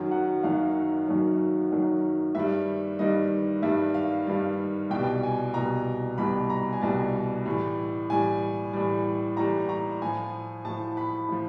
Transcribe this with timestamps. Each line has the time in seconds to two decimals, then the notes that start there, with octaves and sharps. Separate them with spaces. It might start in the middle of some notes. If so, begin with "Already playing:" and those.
Already playing: F#2 D#3 F#3
0.11 F#5
0.43 F#2 D#3 F#3 F5
1.08 F#2 D#3 F#3
1.72 F#2 D#3 F#3
2.35 G2 D#3 G3 E5
2.99 G2 D#3 G3 D#5
3.62 G2 D#3 G3 E5
3.94 F5
4.27 G2 D#3 G3
4.90 C2 B2 G3 G5
5.23 G#5
5.54 C2 B2 G3 A#5
6.18 C2 B2 G3 B5
6.50 A#5
6.73 G#5
6.82 C2 B2 G3 A5
7.46 A2 E3 G3
8.10 A2 E3 G3 G#5
8.73 A2 E3 G3
9.37 A2 E3 G3 A#5
9.69 A#5
10.02 A2 F3 G#5
10.65 A2 F3 A5
10.97 B5
11.29 A2 F3